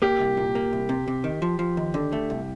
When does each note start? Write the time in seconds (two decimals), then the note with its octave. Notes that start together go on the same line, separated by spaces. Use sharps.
0.02 A#3 G4
0.20 C2
0.37 A#2
0.55 A#3
0.73 C2
0.89 C3
1.08 C3
1.24 D#3
1.42 F3
1.59 F3
1.77 D#2
1.94 D3
2.12 A3
2.30 C2